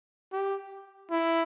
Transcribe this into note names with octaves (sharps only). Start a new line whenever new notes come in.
G4
E4